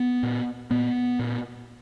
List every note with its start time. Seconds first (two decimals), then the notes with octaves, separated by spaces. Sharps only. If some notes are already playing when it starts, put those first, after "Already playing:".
Already playing: B3
0.23 A#2
0.71 A#2 B3
1.19 A#2